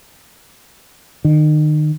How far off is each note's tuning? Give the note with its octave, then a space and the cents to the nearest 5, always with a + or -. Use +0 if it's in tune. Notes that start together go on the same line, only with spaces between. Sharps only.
D#3 -35